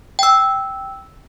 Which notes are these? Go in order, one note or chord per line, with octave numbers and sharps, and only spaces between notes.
G5 E6